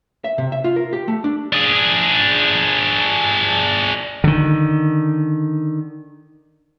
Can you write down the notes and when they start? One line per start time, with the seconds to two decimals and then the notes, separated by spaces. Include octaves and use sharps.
0.24 E5
0.38 C3
0.52 E5
0.64 F4
0.76 A#4
0.93 G4
1.08 A3
1.24 D4
1.53 D4 G#4
4.24 D3 D#3